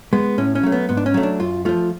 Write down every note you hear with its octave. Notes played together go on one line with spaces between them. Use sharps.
G#3 B3
A2 C#4
C#4
F#3 A3
B3
G#2 B3
D4
C#4
F#3 A3
D4
F#2 F4
F3 A3 F4